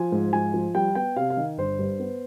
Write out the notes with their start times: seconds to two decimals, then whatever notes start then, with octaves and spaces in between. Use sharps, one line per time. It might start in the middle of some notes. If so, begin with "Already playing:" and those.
Already playing: F3 G#5
0.12 G#2
0.33 F3 G#5
0.54 F3
0.75 G3 G5
0.95 B3 G5
1.16 C3 F5
1.30 F5
1.37 D#3
1.58 G1 C5
1.79 G2
2.00 B3